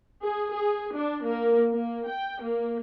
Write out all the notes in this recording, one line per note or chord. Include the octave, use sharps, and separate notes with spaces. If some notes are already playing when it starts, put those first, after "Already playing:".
G#4
G#4
D4
A#3
A#3
G5
A#3